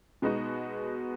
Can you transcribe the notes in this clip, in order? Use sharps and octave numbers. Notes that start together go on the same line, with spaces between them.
B2 G#3 B3 D#4 F#4